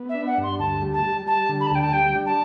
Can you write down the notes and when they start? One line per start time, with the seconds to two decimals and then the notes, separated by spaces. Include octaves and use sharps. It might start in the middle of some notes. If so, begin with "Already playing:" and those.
Already playing: B3
0.09 E5
0.14 D4
0.27 F#5
0.38 G2
0.43 C6
0.59 D2 A5
0.81 G3
0.93 A5
1.04 G3
1.26 G3 A5
1.49 D3
1.60 B5
1.66 A5
1.71 D2 G5
1.82 A5
1.93 G3 G5
2.15 D4
2.26 A5